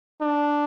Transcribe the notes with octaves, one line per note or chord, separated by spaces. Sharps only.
D4